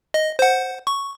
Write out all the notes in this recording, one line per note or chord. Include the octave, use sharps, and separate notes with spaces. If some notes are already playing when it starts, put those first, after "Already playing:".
D#5
C5 F#5
C#6